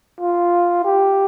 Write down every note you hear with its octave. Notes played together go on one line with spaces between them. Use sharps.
F4
G4